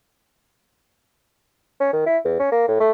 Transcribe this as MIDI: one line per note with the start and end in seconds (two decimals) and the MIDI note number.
1.80 1.88 61
1.93 2.04 51
2.06 2.18 64
2.25 2.39 40
2.40 2.48 61
2.51 2.66 58
2.68 2.77 45
2.80 2.91 57